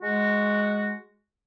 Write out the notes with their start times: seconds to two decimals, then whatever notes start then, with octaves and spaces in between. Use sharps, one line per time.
0.02 G#3 F#4